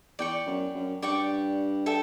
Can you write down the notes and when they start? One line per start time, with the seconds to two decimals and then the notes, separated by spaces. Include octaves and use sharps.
0.19 E2 D5 G5 C#6
0.46 F#2
0.75 F#2
1.02 G2 D5 G5 C#6
1.86 A4 E5 G5